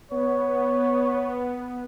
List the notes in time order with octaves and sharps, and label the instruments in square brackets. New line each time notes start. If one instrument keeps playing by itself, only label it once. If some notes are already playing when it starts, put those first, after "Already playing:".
[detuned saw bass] B3 [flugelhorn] C#5